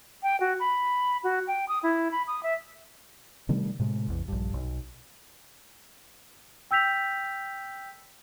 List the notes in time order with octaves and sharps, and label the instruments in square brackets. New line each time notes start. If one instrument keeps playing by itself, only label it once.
[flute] G5
F#4
B5
F#4
G5
D#6
E4
B5
D#6
E5
[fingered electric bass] C3 D#3 G3 A3
A2 C3 G#3
A1 E2
A#1 G2
B1
[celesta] G5 E6 G6 B6 F7